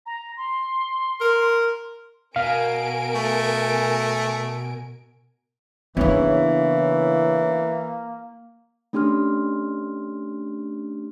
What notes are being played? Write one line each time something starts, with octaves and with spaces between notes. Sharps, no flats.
A#5
C6
A#4
B2 A#4 F5 G#5 D7
A3
C#3 E3 A#3 B3 D4 E4 C#5
A3 C#4 D4 G4 C6 F6